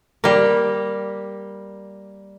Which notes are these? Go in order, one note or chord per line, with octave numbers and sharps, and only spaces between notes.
G3 A#3